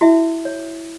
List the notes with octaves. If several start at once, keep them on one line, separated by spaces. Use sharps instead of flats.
E4 F#4 E5
C#5